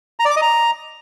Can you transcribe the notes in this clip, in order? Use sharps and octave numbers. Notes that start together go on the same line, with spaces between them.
A#5
D5
D6
D#5
A#5